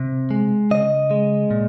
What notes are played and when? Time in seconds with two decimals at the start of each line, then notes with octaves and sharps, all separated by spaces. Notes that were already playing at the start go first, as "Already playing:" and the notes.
Already playing: C3
0.31 G#3
0.71 C#3 D#5
1.11 G#3
1.51 A#2